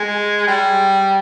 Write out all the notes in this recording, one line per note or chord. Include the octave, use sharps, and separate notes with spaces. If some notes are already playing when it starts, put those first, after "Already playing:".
Already playing: G#3
G3